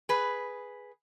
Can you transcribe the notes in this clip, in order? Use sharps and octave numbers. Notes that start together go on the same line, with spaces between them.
G#4 B4